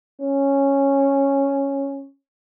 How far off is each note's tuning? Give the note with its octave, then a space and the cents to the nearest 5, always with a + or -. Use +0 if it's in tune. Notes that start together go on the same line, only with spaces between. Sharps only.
C#4 -5